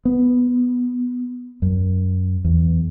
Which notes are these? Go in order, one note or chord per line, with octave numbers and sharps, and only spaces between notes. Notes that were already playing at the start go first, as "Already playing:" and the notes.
B3
F#2
E2